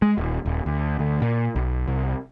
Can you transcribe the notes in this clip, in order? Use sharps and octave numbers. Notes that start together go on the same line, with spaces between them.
G#3
D#1
D#1
D2
D2
A#2
B1
C2